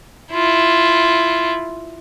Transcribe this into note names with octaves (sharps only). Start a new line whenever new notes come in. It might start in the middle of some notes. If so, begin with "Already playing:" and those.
E4 F4